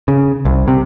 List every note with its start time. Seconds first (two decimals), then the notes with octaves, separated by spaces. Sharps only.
0.08 C#3
0.45 C2
0.68 C3